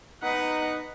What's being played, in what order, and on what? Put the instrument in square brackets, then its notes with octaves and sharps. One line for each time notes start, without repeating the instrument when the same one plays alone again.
[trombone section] B3 D#4 [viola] B4 F#5